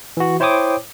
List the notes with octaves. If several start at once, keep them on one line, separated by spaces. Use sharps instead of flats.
E3 F#4
E4 C5 C#5 G5 D6 D#6